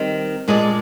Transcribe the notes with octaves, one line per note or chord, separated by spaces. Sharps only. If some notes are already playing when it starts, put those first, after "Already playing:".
Already playing: D#3 G3 C4
A#2 G#3 D4 G#4 D5